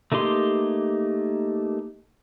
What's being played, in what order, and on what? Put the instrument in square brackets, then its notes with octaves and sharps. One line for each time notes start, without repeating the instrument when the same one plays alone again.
[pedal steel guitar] A3 A#3 D#4 G4 C6